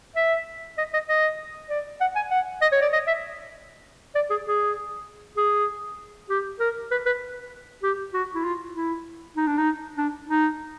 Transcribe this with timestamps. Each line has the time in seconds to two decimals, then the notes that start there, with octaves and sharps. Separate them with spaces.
0.16 E5
0.78 D#5
0.93 D#5
1.08 D#5
1.69 D5
2.01 F#5
2.16 G#5
2.31 F#5
2.62 D#5
2.72 C#5
2.82 D5
2.93 D#5
3.07 E5
4.15 D5
4.30 G#4
4.45 G#4
5.37 G#4
6.30 G4
6.60 A#4
6.91 B4
7.06 B4
7.83 G4
8.14 F#4
8.34 E4
8.44 F4
8.74 E4
9.36 D#4
9.47 D4
9.58 D#4
9.97 D4
10.28 D#4